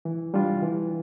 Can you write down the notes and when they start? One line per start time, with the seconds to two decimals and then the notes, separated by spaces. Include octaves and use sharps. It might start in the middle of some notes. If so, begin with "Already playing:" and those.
0.05 E3
0.34 G3 D4 F4
0.62 E3